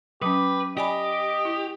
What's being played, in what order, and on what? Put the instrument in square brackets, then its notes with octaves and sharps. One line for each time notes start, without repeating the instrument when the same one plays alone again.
[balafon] F#3 C#4 [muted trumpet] G4 [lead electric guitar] B4
[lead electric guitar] G4 [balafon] D5 G#5 B5 [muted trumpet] D#5
[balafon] E4